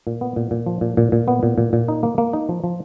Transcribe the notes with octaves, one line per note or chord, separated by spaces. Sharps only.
A#2
B3
A#2
A#2
F3
A#2
A#2
A#2
B3
A#2
A#2
A#2
D#4
A#3
A#3
D#4
F3
F3